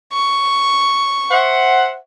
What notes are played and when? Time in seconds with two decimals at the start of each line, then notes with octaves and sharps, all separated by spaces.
0.13 C#6
1.31 C5 E5 F#5